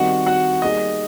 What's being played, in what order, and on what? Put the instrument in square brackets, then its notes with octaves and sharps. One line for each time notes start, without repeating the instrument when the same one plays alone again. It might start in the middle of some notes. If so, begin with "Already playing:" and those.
Already playing: [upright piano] D#3 G3 C4 D#4 [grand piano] F#4 F#5
[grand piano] F#4 F#5
[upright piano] G3 A#3 D#4 G#4 [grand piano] D#5